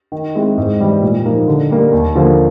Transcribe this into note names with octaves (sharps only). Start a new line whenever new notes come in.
D#3
G#3 C4 E4
G#2
E3 G3
A#2
F3 A#3 D#4
D3
G3 A#3
D#2
D3 F3 A#3